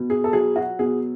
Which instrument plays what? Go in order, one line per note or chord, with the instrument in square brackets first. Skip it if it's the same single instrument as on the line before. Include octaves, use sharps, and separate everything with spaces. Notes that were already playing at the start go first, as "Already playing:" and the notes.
Already playing: [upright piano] B2
G#4
A4
F#3 G#4
F#4
B2 G#4